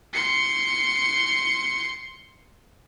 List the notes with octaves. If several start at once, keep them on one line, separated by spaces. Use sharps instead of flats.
C6 C#7